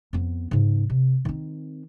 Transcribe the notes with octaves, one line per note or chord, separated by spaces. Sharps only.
F2 B3
G#2 C#3
C3
D#3 C4